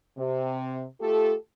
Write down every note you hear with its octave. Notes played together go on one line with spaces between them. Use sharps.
C3
A3 F4 G4 A4